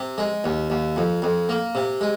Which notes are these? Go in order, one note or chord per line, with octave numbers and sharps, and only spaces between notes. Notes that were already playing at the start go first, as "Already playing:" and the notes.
Already playing: C3
G#3
D#2
D#2
F2
F2
A#3
C3
G#3